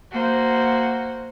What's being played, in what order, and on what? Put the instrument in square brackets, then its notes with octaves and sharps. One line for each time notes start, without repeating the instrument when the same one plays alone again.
[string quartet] A#3 F#4 C5